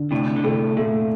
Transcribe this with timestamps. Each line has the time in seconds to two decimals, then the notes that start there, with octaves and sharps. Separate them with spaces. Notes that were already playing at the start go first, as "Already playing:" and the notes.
Already playing: D3
0.11 A2 C3 D4
0.36 D3
0.44 A2 C3 A4
0.77 A#2 A3